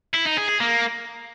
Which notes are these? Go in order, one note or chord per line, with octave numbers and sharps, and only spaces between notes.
E4
D#4
G#4
G#4
A#3